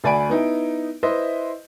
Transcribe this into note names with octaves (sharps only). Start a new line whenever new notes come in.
D2 D5 G#5 B5 D7
B3 D#4 E4
E4 B4 C5 D#5 E5